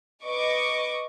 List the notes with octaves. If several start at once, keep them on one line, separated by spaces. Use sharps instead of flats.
B4 D#5 C#6 D6